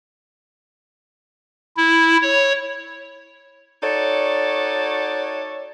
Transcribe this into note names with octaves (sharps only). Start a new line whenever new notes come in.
E4
C#5
D#4 F#4 A4 C#5 D5